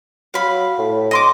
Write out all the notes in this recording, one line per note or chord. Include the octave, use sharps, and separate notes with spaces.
F#3 F5 B5
A2
D#5 C6 D6